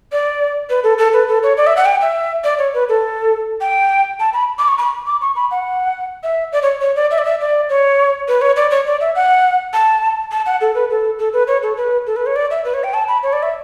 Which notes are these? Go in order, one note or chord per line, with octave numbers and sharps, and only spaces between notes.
D5
B4
A4
A4
B4
A4
C#5
D5
E5
F#5
G5
E5
D5
C#5
B4
A4
G5
A5
B5
D6
C#6
B5
D6
C#6
B5
F#5
E5
D5
C#5
C#5
D5
E5
D5
E5
D5
C#5
B4
C#5
D5
C#5
D5
E5
F#5
A5
A5
F#5
A4
B4
A4
A4
B4
C#5
A4
B4
A4
B4
C#5
D5
E5
B4
C#5
G5
A5
B5
C#5
D5
E5